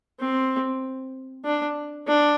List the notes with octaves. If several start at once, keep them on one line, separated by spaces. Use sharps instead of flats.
C4
D4
D4